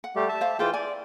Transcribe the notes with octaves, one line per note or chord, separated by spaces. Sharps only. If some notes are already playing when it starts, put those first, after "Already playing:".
F#5
G3 A3 G4
E5 A5
C5 F5
E3 F4 G#4 C5 D5 G5
D5 G#5